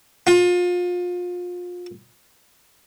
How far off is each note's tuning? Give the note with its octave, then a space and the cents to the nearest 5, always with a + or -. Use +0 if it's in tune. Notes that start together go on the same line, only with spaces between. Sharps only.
F4 +30